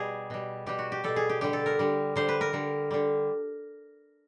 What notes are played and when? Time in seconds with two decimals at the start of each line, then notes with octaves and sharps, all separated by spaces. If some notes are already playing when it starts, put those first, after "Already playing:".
Already playing: B2 G3 G#4
0.30 B2 G3
0.66 B2 G3 G4
0.79 F#4
0.92 G4
1.04 B2 G3 A4
1.16 G#4
1.30 G4
1.41 D3 G3 G4
1.53 A4
1.66 A#4
1.79 D3 G3
2.16 D3 G3 C5
2.29 B4
2.41 A#4
2.53 D3 G3
2.91 D3 G3